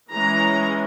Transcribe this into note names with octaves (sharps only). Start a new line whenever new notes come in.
E3 G#3 C#4 A#5